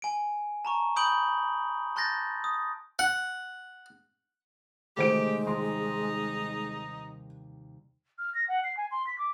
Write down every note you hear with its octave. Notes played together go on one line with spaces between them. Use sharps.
G#5 D7
A5 A#5 C#6
B5 D#6 G6 D7 F#7 G7
A5 C6 F#6 G6 A6 A#6
D#6
F#5
C3 D#3 G#3 A3 G4 C5 D7
D#2 G3 D#4 C6
F6
A#6
F#5
C7
G#5
C6
B6
D6